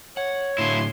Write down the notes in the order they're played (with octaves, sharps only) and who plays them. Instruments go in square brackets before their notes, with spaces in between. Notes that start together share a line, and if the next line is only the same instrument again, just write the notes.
[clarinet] C#5 [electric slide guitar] F#5
[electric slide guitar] A2 D3 [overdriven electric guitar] F#3 E4 [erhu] C6